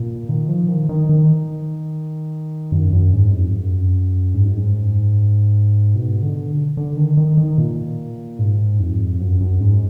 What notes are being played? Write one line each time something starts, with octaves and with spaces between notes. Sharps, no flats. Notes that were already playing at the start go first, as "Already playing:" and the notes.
Already playing: A#2
D#3
F3
D#3
D#3
D#3
F#2
F#2
G#2
F2
F#2
G#2
F#2
G#2
B2
D3
D3
D#3
D#3
D#3
A#2
G#2
F2
F#2
F#2
G#2